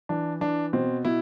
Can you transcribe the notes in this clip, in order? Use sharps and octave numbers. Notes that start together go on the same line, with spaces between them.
E3 D4
E3 D4
B2 C4
B2 E4